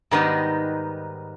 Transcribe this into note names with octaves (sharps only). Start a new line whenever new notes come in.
G#2 D#3 G3 B3 D#4